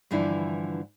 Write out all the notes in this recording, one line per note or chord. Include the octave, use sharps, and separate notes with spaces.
G2 D3 E3 F3 D4 E4